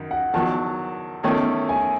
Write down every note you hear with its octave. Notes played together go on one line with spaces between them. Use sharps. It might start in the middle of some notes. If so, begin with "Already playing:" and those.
Already playing: F#2 D#3
F#5
E2 D#3 F#3 A5
E2 D#3 A3 C#4
G#5